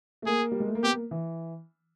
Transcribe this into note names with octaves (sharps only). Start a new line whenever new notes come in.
A3
A#3 G#4
G3
G#3
A3
A#3
B3 G4
A#3
E3